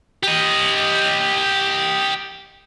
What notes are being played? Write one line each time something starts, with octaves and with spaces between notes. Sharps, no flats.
G4 D#5